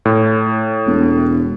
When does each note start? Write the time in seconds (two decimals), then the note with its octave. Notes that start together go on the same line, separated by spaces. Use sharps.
0.05 A2
0.87 E1